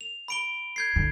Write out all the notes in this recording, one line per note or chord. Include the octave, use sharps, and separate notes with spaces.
F7
B5 D7 G7
G6 G#6 C7
D3